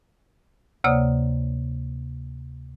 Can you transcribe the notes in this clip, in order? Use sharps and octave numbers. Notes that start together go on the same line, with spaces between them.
D2 C3 A#3 C#5 D5 D#6